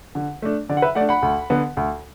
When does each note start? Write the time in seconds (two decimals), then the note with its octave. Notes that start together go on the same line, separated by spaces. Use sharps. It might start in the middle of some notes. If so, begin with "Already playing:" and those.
0.15 D3
0.42 A3 D4
0.69 D3 D5
0.77 F#5
0.82 B4 E5
0.95 A3 D5 F#5
1.01 D4
1.09 F#5 B5
1.22 D2
1.50 D3 B3
1.77 D2